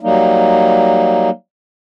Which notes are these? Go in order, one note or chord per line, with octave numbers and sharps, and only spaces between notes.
F#3 G3 A#3 D#4